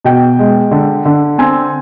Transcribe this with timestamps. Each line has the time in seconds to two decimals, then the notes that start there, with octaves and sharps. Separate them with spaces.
0.05 B2 G5
0.39 G#3
0.71 D3
1.05 D3
1.38 C4 G#5